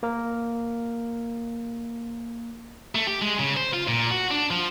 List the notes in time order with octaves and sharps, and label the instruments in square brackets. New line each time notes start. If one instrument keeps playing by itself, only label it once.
[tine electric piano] A#3 A#4
[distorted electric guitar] A3
G4
G#3
C#3
C5
F4
A#2
F#4
D4
F3